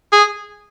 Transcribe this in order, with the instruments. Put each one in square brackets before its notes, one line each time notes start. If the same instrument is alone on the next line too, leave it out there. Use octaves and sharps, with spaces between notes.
[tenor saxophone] G#4